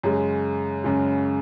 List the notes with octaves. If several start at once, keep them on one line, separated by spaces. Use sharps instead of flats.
F#2 C#3 G#3
F#2 C#3 G#3